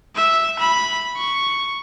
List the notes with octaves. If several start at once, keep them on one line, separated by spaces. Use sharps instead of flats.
E5
B5
C#6